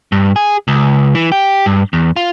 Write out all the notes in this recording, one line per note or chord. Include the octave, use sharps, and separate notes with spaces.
G2
G#4
C#2
E3
G4
G2
E2
F4